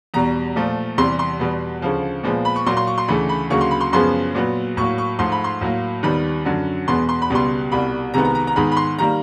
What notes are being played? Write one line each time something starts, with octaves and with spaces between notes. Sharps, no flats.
E2 B2 G3 A#5
A#2 F3 A3
E2 C3 E3 G3 C6
C6
E2 B2 G3 B3
D2 C#3 F3
A#2 F3 G#3 B3
B5
C#6
A#2 F#3 A#3 C6
C6
C#6
C6
D2 C#3 E3 A3 B5
B5
D2 C#3 F#3 A#3 C#6
C6
B5
C6
F#2 C#3 F3 G#3 B3 C6
A#2 F#3 B3
A2 F#3 A#3 C#6
C#6
G#2 F3 A3 C6
B5
C6
A2 F#3 A#3
D#2 D#3 G3 B3 B5
F#2 D3 F#3
E2 B2 G#3 B3 C6
C6
B5
C#2 B2 G3 B3 C6
C2 B2 G3 B5
C2 C3 D#3 G#3 B3 A#5
A#5
A#5
A#5
G#2 D#3 G#3 B3 B5
B5
C6
D#3 G3 A#3 A#5